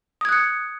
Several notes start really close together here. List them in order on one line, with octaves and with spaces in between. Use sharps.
D#6 G#6 F#6 C#7